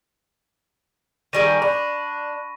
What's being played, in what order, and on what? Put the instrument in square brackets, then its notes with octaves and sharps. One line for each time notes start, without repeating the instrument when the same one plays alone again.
[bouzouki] D#3 G3 G#4 [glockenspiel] C#6 A#6 D#7
[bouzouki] D4 [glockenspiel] B5